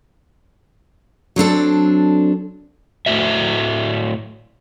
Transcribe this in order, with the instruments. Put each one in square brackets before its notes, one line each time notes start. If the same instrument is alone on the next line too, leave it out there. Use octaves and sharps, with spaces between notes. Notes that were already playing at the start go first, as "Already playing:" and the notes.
[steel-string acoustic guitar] F#3 C4 D4 A4
[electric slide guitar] A2 A3 F#4 E5